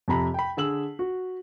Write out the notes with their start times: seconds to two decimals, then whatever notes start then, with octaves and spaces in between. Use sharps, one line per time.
0.08 F2 C3 A#5 B5
0.34 G5 B5
0.57 D3 G#4 E6 F#7
0.99 F#4